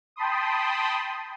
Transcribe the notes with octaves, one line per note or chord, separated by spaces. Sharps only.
G5 A5 B5 C6 D#6